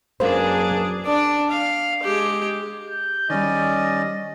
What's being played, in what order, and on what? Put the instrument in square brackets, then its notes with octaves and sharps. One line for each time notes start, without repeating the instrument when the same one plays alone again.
[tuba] F#2 [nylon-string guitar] A#3 B4 [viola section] D4 G#4 [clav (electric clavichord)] C5
[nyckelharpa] D4 D5
F5
G#3 G4
[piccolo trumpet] G6
[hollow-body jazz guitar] D#3 G3 [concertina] C#4 D5 [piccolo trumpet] D#5